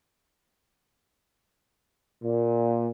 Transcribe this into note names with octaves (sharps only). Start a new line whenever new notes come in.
A#2